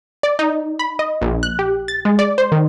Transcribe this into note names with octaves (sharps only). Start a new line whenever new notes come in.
D5
D#4
B5
D#5
A#1
F#6
G4
A6
G#3
D5
C5
D#3